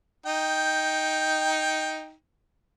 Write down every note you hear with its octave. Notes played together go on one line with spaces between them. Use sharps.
D#4 G5